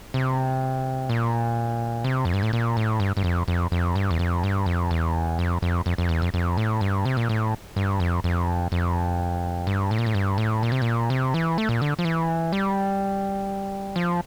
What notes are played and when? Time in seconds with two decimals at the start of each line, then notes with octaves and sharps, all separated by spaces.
0.14 C3
1.09 A#2
2.04 C3
2.25 F2
2.34 G2
2.43 A2
2.53 A#2
2.77 A2
3.00 G2
3.17 G2
3.24 F2
3.48 F2
3.72 F2
3.96 G2
4.11 E2
4.19 F2
4.43 G2
4.66 F2
4.91 E2
5.39 F2
5.62 F2
5.86 F2
5.98 F2
6.09 E2
6.22 F2
6.34 F2
6.57 A2
6.81 G2
7.05 C3
7.17 A#2
7.29 A2
7.76 G2
8.00 F2
8.24 F2
8.72 F2
9.67 G2
9.91 A2
9.99 A#2
10.06 A2
10.15 G2
10.38 A2
10.63 A#2
10.72 C3
10.82 A#2
11.10 C3
11.34 E3
11.58 A3
11.69 A#2
11.82 D3
11.99 F3
12.05 E3
12.53 G3
13.96 F3